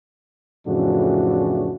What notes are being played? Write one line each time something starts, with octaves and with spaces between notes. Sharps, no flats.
F2 A2 C#3 E3 D4 F#4